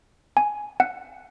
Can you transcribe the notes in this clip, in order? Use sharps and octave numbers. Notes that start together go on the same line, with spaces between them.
G#5
F#5